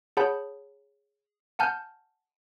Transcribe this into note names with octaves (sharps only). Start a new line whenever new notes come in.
G#4 C#5 F#5 A5 B5 G6
F#5 G#5 A5 F6 G6